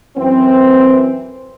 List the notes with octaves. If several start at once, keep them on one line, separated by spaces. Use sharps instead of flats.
F#2 E3 C4